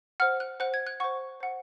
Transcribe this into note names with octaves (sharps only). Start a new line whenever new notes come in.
C5 F#5 F6
F#6
C5 F#5 F#6
G#6
F#6
C5 F#5 C#6
C5 F#5